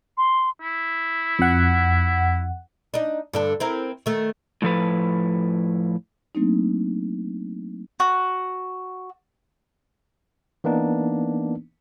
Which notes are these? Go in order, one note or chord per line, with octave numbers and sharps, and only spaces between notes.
C6
E4
F2 F#5
D4 D#4
G2 D3 A4
C4 E4 A#4
D#3 A3
A2 F3 A4 B4
F#3 A3 A#3 C4 D4 D#4
F#4
E3 A#3 B3 D4 D#4